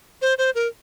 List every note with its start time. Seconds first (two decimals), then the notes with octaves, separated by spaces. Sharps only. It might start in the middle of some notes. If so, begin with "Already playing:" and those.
0.22 C5
0.38 C5
0.55 A#4